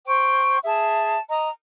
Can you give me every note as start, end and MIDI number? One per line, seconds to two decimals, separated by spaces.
0.06 0.57 72
0.06 0.57 79
0.06 0.57 85
0.64 1.18 68
0.64 1.18 76
0.64 1.18 81
1.29 1.49 75
1.29 1.49 82